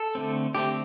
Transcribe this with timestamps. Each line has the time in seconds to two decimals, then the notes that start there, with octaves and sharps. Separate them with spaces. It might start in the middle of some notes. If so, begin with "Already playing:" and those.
Already playing: A4
0.15 D3 A3 C4
0.55 D3 A3 C4 G4